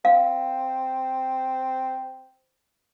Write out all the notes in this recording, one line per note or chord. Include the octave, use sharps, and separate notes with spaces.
C4 F5